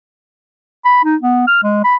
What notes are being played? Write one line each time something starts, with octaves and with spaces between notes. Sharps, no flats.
B5
D#4
B3
F6
G#3
B5